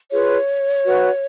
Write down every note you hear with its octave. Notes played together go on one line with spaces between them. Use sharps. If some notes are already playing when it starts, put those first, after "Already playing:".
F4 G#4 B4 C#5
F#4 B4